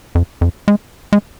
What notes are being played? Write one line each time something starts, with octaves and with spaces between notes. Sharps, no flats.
F2
F2
G#3
G#3